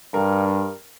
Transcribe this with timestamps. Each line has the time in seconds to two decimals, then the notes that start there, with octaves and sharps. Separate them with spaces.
0.14 G2 A#4